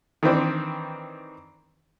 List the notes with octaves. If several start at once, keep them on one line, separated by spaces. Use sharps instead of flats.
D#3 E3 C4 D4